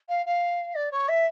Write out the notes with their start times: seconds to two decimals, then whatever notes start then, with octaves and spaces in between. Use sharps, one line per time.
0.08 F5
0.25 F5
0.74 D5
0.91 C#5
1.08 E5